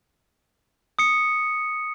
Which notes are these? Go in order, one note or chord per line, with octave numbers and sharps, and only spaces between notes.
D#6 C#7